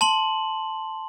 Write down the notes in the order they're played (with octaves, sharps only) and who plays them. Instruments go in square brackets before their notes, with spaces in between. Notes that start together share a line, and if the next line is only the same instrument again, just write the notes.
[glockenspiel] A5 C6 F#7